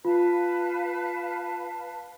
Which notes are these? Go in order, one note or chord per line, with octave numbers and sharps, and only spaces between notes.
F4 B4 F5 A5